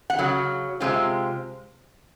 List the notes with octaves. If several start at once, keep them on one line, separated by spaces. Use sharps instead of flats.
F#5
C#3 F#3
C3 D#3 G#3 C4 F4